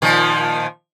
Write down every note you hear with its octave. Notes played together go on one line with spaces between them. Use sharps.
A#2 D#3 F3